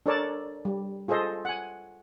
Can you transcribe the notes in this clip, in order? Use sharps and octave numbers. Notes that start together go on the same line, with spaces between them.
D4 A4 A#4 C#5 D5 A5
G3
F4 G#4 A4 C5 D#5
F#5 G#5